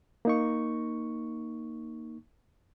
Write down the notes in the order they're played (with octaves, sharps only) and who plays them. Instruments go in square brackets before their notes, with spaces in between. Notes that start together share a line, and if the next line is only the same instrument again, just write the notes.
[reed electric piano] A#3 D#4 C#6